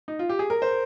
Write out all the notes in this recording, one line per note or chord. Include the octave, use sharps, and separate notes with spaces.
D#4
F4
G4
G#4
A#4
C5